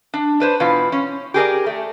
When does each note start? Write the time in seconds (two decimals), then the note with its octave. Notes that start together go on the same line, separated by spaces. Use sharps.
0.14 D4
0.40 D4 B4 C5
0.60 B2 E3 F4 B4
0.92 C#4
1.34 G4 G#4 A#4 D5
1.66 A3